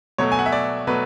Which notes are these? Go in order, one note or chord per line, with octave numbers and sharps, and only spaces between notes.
B2 F#3 A3 C#5
G#5
F#5
E5
D5
B2 F#3 A3 B4